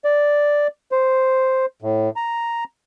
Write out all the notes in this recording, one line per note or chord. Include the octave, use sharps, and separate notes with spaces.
D5
C5
A2
A#5